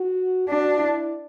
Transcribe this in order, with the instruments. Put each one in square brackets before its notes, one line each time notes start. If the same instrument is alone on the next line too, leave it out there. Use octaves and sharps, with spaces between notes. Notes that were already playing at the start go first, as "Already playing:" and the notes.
Already playing: [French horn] F#4
[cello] D4 [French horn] F#4
[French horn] E4